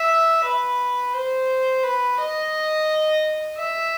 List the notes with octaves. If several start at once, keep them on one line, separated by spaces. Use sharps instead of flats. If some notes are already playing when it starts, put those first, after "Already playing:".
Already playing: E5
B4
C5
B4
D#5
E5